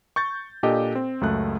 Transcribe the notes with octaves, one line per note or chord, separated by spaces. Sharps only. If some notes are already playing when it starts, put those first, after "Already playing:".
C#6 G6 A6
A#2 D4 G4 A4 D#5
C4
C#2 F#2 A3 F#6